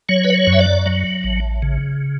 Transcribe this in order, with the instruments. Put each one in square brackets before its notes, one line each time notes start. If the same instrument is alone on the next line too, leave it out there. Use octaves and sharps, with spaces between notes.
[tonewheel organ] F#3 C#5
B4
C#5
F#2
E5
D5
F#3
A1
C#3